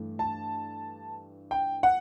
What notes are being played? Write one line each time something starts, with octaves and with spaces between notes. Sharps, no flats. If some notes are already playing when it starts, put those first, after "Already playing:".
Already playing: G2 E3 A3
A5
G5
F#5